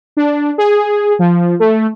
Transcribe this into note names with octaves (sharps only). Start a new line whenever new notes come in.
D4
G#4
F3
A3